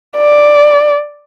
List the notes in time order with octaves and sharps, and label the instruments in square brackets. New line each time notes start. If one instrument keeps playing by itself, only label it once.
[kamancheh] D5